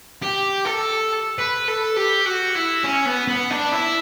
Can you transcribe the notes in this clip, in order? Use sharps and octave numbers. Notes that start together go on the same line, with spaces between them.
G4
A4
B4
A4
G4
F#4
E4
C#4
B3
B3
D4
E4